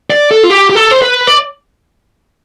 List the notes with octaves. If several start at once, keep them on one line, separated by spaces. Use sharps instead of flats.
D5
A4
F4
G4
G4
A4
C5
B4
D5